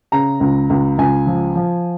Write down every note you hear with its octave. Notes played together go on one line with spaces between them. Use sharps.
C#3 A#5
C#2
C#2
C#2 G#5
F3
F3